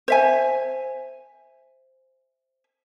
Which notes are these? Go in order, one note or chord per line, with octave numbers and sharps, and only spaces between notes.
C5 E5 G#5